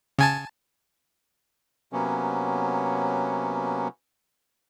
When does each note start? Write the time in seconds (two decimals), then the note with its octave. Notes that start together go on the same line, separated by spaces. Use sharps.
0.19 C#3 G#5 A5
1.93 C3 F#3 A#3 B3 C#4